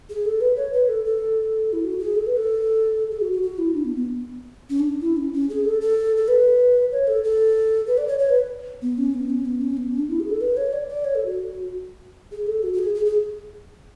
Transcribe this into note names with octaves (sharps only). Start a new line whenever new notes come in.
G#4
A4
B4
C#5
B4
A4
A4
E4
F#4
G#4
A4
B4
A4
G#4
F#4
F#4
F#4
E4
D4
B3
B3
C#4
D4
E4
C#4
C#4
G#4
A4
A4
A4
B4
C#5
A4
A4
B4
D5
C#5
C#5
B4
B3
C#4
B3
C#4
B3
C#4
B3
C#4
D4
E4
G#4
A4
B4
C#5
D5
D5
C#5
A4
F#4
G#4
A4
F#4
F#4
G#4
G#4
G#4